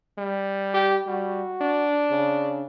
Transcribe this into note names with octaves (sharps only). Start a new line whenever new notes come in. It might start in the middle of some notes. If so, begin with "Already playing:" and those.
G3
G4
G3 F#4
D4
C#3